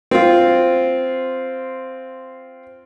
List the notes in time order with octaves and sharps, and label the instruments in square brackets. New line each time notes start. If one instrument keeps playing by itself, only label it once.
[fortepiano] C4 F4